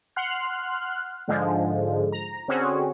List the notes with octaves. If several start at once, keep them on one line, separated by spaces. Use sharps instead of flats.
F#5 C6 F6 F#6
G#2 D3 F3 G#3
A#5
D3 C4 C#4 F#4 G#4